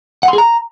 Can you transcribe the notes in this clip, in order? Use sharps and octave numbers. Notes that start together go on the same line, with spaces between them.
F#5
C6
G#4
A#5